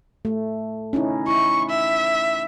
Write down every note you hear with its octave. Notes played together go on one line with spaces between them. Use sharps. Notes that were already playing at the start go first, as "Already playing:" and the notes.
A3
C#4 D#4 E4
E4 C#6
E5